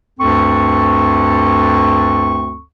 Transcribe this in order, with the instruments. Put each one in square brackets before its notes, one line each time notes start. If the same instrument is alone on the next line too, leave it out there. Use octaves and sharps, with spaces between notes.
[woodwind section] D2 G2 C4 A4 C#6